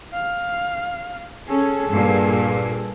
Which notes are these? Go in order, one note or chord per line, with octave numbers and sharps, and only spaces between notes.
F5
C#4 G#4 A4
G2 A#2